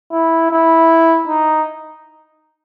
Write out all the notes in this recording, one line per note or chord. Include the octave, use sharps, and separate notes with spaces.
E4
E4
D#4